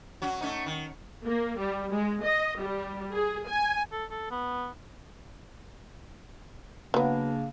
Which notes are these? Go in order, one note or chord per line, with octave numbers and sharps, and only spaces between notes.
F#3 C#4 F#4
A3 C#4 D#4
D#3
A#3
G3
G#3
D#5
G3
G#4
G#5
A4
A4
B3
C#3 F#3 A#3 B3 D4